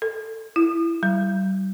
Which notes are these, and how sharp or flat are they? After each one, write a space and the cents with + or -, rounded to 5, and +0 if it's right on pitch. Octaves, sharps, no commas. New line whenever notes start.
A4 +15
E4 +15
G3 -40